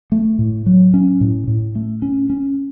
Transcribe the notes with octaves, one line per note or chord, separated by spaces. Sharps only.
A3
A2
F#3
C#4
A2
A2
A3
C#4
C#4